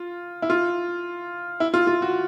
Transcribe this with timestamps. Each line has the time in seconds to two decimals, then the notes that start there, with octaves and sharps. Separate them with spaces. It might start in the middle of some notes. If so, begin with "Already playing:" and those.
Already playing: F4
0.42 E4
0.50 F4
1.60 E4
1.74 F4
1.87 F4
2.02 F#4